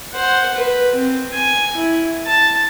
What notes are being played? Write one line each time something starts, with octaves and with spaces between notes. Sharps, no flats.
C5 F#5
B4
C4
G#5
E4
A5